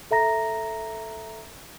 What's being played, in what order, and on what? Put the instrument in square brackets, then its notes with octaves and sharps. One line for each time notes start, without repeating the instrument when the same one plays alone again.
[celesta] A4 E5 A#5 A#6